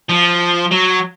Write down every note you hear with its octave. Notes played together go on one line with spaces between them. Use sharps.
F3
F#3